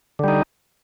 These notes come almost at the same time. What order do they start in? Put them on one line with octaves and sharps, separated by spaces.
D3 G3 D#4